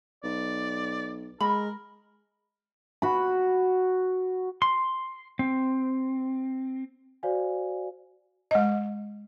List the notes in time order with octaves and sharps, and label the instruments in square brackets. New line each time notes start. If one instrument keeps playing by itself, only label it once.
[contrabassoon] B1 [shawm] D5
[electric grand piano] G#3 [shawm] A#4 [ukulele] B5
[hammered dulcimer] F#4 B5
[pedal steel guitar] C6
C4
[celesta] F#4 C5 D5 F5 G#5
[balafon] G#3 D#5